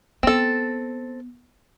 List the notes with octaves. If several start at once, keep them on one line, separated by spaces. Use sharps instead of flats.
B3 C4 A4